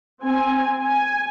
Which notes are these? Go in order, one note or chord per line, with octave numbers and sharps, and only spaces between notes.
C4 G#5
G#5